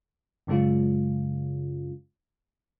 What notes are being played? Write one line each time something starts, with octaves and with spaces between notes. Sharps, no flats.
F#2 C#3 G#3 C#4 F4